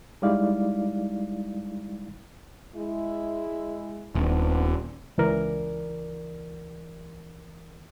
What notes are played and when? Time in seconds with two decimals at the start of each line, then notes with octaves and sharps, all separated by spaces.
0.22 G3 G#3 D#4 E4 D5 F5
2.75 G#3 E4
4.15 D#1 B3 C4 D4
5.18 C#2 E3 A#4 D5